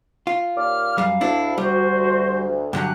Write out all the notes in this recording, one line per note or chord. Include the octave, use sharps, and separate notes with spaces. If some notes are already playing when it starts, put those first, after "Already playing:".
F4
D#2 A#2 D6 F6
F#2 G3 F5
D2 D4 E4
G3 F#4 C5
G2 D3 F#3 G4 F#5 G#5 F#6